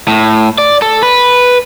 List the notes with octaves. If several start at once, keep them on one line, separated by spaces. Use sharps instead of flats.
A2
D5
A4
B4